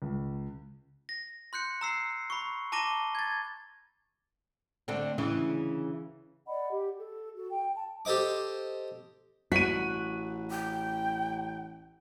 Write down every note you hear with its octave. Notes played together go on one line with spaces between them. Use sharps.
C#2
A#6
C6 F#6 G6 C#7
A#5 E6 C7
B5 C#6
A5 A#5 D6 A#6 D#7 G7
G#6 A6
D3 A3 C4
D2 C#3 E3
D5 D#5 F#5 B5
G4
A4
F#4 A4
G5
A5
G4 A4 C5 D#5 D6
A1 F#4 B6 D#7
G5